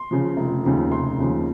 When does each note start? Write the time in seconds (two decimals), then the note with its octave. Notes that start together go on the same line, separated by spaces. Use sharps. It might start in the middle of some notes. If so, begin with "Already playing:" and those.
Already playing: C6
0.11 C#3 F3
0.37 F1
0.64 D#2 C#3 F3
0.91 F1 C6
1.18 D#2 C#3 F3